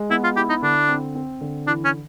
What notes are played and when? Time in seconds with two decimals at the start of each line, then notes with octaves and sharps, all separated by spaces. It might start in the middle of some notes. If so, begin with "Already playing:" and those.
Already playing: G#3
0.10 B3 E4
0.24 F4
0.36 E4 G4
0.50 D#4
0.62 D3 D4
0.88 C4
1.15 C4
1.41 D3
1.67 E3 D4
1.84 C#4